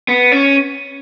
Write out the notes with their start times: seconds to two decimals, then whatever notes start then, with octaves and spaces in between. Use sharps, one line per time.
0.08 B3
0.32 C#4